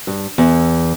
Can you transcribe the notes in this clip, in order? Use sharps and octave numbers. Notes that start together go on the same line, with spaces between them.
G2
E2